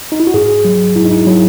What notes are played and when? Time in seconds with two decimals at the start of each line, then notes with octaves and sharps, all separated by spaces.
0.12 D#4
0.20 E4
0.27 F#4
0.34 G#2 G#4
0.65 F#3
0.96 G#2 E4
1.05 D#4
1.12 E4
1.27 F#3 E4